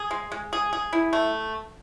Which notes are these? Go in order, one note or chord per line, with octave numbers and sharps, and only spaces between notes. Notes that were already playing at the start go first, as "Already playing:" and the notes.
Already playing: G#4
G#3
G#3
G#4
G#4
E4
A3